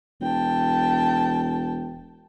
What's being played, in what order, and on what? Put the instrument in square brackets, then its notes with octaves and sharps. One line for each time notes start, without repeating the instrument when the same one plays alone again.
[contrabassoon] E1 [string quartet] G5 A5